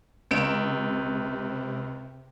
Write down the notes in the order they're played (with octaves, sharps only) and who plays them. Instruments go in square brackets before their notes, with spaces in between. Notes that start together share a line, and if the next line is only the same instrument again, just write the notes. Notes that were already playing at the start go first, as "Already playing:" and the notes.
[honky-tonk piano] C#2 D7 E7 [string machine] C3